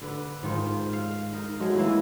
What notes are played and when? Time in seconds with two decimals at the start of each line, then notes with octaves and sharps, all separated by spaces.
0.02 D3 B4
0.43 G#2 D#3 F4 C5
0.93 F5
1.33 D#4 A#4
1.60 F#3 G#3 A3
1.76 E3 A#3 C#4 E4